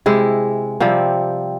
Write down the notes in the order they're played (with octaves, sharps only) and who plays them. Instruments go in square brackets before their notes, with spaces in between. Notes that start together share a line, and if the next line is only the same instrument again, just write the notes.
[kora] C3 G#3 E4
C3 F3 G3 C4